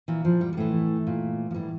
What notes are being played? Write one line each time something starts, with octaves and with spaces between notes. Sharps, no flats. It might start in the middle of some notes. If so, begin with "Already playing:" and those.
A#2 E3
F3
G3
G3
A2 E3 A3
A#2
F3
A2 E3 G3